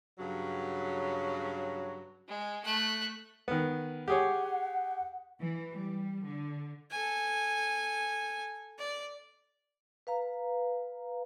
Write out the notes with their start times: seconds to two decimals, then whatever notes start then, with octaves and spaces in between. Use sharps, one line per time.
0.19 G2 C#3 F#3
2.28 G#3
2.64 A3 F#6
3.48 D#3 B3
4.08 G4 G#4 C#5 F#5
5.40 E3
5.74 G3
6.28 D3
6.92 A4 G#5
8.79 D5
10.07 B4 F5 A#5